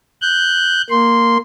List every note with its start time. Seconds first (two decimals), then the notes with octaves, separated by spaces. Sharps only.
0.22 F#6 G6
0.90 A#3 C6